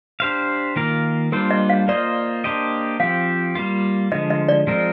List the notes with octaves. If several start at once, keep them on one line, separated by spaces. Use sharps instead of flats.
D4 G4 C5 F5
D#3 A#3 F4 A#4 F5
G3 A#3 D4 F4 A#4 C5
D#5
F5
A#3 F4 C5 D5 D#5
A#3 D4 G4 C5 D#5
F3 C4 G4 F5
G3 A#3 F4
D3 F3 G#3 D#5
D#5
D5
F3 G#3 C4 F4 A#4